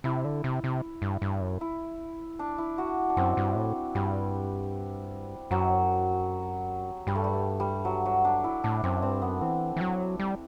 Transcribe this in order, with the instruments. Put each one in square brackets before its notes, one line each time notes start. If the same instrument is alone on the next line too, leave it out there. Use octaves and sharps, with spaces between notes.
[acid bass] C3 [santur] E4
[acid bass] D3
C3
C3
G2
G2
F#2
[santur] E4
D4
E4
F#4
D4
[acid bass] F#2 [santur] C4
[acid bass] G2
A2
[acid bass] G2 [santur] G3
[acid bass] F#2 [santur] F#3
[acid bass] G2 [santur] G3
[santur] A3
G3
A3
G3
F#3
F#3
D4
E4
[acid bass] A2 [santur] D4
[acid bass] F#2 [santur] C4
[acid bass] G2 [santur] C4
[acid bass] F#2 [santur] B3
[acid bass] E3 [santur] C4
[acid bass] E3
F#3
G3